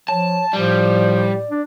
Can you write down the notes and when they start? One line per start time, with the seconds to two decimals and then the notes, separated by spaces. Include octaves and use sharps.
0.08 F3 C#5 A5
0.53 A2 F3 G3 D5
1.51 D4